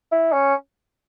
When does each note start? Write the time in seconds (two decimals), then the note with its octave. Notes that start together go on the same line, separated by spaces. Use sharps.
0.12 E4
0.33 C#4